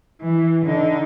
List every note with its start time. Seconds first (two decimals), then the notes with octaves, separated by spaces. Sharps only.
0.21 E3
0.65 D3 D#4